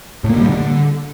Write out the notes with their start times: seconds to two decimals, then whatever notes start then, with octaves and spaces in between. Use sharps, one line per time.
0.24 A2
0.30 A#3
0.35 D3
0.41 G3
0.46 D3